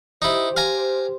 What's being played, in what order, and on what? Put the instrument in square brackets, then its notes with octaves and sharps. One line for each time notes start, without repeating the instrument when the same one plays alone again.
[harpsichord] D#4 E4 [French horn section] G4 C5
[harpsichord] F5 G#5 A#5